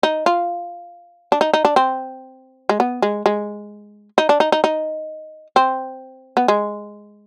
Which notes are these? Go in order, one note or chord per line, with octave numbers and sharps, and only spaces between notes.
D#4
F4
D4
D#4
D#4
D4
C4
G#3
B3
G#3
G#3
D#4
D4
D#4
D#4
D#4
C4
B3
G#3